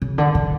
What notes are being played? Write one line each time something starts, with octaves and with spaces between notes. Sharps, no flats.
C#3
D3
D3